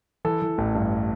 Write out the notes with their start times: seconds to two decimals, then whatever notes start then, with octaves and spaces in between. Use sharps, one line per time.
0.25 E3 A4
0.42 E3
0.58 A1
0.75 G2